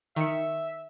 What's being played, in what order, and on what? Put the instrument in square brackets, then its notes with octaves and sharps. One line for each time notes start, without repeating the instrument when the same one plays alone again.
[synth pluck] D#3 C#7 [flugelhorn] E5